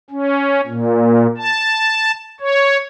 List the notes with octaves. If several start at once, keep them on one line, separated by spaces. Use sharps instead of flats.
C#4
A#2
A5
C#5